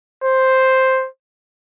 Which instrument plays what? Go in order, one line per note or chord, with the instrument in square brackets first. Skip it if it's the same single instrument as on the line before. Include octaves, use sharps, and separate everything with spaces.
[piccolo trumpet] C5